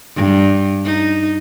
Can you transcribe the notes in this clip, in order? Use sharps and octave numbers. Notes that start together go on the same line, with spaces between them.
G2
D#4